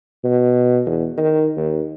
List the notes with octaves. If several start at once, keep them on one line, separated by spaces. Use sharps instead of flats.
B2
E2
D#3
D#2